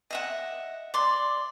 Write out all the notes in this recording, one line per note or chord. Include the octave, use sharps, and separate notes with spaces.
D#5 E5 F#5
D5 C6